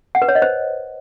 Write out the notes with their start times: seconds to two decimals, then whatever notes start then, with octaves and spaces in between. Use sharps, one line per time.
0.15 F#5
0.22 B4
0.28 C#5
0.35 D#5
0.42 C5